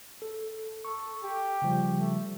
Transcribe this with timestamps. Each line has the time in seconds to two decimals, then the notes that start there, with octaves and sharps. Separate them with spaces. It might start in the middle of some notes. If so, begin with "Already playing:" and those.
0.22 A4
0.85 A4 C#6
1.23 G4
1.62 C#3 F3 G3
1.99 A3